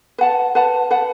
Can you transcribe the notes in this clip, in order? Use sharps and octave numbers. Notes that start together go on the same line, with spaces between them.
B4 F#5 A5
B4 F#5 A5
B4 F#5 A5